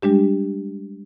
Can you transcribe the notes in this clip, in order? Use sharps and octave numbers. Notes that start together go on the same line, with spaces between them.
G3 G#3 D4 G4